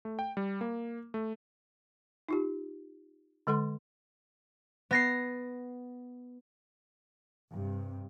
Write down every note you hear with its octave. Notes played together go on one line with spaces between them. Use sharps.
A3
G5
G3
A#3
A3
D#4 F4 G4
D3 G#3 A4 F#5 C6
B3 A#6 C7
G2 C3